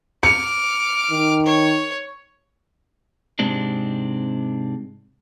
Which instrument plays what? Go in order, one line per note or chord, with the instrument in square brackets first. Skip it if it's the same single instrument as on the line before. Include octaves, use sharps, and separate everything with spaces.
[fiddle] D6 F6 [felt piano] C#7
[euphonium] D#3
[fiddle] C#5
[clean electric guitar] G#2 C3 G#3 C4 D4